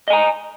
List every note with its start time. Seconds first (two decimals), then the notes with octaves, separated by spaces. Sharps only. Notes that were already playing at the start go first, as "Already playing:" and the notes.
0.08 D#5
0.10 G#5
0.13 A#5